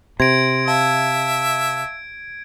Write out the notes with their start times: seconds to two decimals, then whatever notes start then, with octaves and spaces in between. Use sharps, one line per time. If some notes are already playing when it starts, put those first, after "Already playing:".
0.20 C3 C6 G#6 A#6 D7
0.68 E5 F5 A5